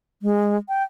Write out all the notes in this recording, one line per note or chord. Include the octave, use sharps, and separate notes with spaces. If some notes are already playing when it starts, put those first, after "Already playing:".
G#3
G5